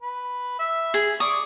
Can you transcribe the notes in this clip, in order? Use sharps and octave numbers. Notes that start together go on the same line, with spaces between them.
B4
E5
G#4
D5 C#6 D#6